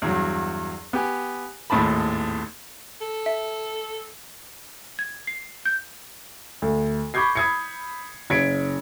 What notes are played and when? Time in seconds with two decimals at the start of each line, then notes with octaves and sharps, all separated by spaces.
0.02 E2 G2 F#3
0.93 B3 G4 G#5
1.70 G#1 D#2 A2 A5 B5
3.01 A4
3.26 E5
4.99 G#6
5.27 C7
5.65 G6
6.62 D2
7.14 B5 C#6 D6 G6 G#6 C7
7.35 B5 D#6 E6 G#6 C7 C#7
8.30 F#1 G#6 B6 C#7 D7